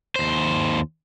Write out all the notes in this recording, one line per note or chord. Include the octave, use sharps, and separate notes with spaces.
D#2 C5